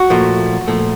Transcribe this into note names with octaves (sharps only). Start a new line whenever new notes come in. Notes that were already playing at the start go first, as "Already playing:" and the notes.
Already playing: F#4
A#2 F3 A3
A#2 F3 A3